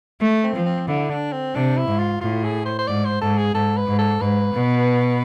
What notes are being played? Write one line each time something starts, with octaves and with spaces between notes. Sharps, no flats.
A3
C4
F3
C4
D3 E4
D4
C4
C3 D4
E4
G#2
F4
A2 F4
G#4
C5
C5
G#2 D5
C5
G#2 A4
G#4
G#2 A4
B4
G#2
A4
G#2 B4
B2